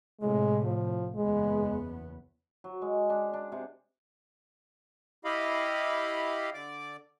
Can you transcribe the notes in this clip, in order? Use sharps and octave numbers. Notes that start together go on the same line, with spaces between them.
A2 C3 G#3
F3
F#1 E2 G#3 B3
F#3
G#3
D4
D4
C3
E4 G4 D#5 F5 B5
D3 D5 D6